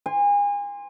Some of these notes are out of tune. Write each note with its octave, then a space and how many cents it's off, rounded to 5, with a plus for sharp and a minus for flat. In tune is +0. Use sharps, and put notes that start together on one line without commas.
G#5 -35 C6 +0